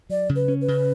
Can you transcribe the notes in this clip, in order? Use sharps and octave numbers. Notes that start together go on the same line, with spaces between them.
F#3 D5
C#3
B4
C#4
B4
C#3